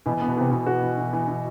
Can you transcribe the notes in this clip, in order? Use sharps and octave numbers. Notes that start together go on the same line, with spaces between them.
B2 E3
B2
B3
B2
C3 E3
B2 E3
F#4
E3
E3
E3
E3